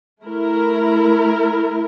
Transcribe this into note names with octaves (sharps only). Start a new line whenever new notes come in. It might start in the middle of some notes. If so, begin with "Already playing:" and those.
A3 E4 A#4